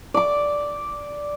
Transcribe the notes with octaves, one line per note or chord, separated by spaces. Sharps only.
D5 D6